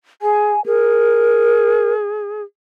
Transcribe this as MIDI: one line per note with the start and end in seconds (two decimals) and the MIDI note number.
0.22 0.51 68
0.22 0.64 80
0.66 2.42 68
0.66 1.94 70